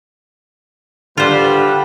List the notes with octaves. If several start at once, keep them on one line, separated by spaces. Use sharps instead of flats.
D3 G3 F4 B4 C5